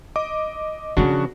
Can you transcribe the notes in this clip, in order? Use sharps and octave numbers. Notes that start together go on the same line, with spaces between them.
D#5 D6
C#3 E3 F3 D4 F#4